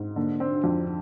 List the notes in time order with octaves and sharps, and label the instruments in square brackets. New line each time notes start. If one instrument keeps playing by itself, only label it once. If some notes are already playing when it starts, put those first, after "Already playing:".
Already playing: [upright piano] G#2
[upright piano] D3 [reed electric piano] A#3
[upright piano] C4 [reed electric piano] D4
[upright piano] F2 [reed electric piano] D4